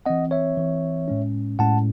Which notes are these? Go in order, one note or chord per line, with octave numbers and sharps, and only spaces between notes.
E3 C4 D#5 F#5
C#5 E5
E3 C4
A2 G#3 C#4
A2 G#3 C#4 F#5 A5